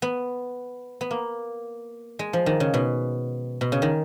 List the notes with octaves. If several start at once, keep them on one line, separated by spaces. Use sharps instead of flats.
B3
B3
A#3
G#3
F3
D#3
C#3
B2
B2
C#3
D#3